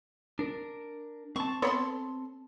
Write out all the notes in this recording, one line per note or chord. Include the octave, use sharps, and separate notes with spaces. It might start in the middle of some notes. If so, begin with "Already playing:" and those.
D4 A#4
C4 A5 C#6
B3 A4 C#5 B5 C6